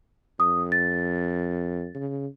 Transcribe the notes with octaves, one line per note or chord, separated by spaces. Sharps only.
F2 D#6
A6
C#3